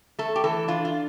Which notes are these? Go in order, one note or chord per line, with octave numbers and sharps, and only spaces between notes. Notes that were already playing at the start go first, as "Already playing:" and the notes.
A3 A4
G4
E3 A4
D4 F4
F4